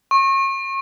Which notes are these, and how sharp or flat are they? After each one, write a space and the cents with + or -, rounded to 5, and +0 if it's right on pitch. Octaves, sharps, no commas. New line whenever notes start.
C#6 -35